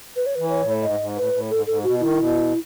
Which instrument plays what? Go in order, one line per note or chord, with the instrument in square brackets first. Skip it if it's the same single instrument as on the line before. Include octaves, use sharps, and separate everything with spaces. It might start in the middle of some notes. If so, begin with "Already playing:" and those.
[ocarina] B4
C#5
[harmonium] E3 [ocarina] B4
[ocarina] C#5
[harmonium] A2
[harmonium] G#2 [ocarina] D#5
[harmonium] G#2
[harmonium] A2 [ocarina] B4
[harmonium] A2
[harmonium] G#2 [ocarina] A4
[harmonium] G#2 [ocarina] A4
[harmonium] B2 [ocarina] F#4
[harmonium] D#3 [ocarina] E4
[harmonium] B2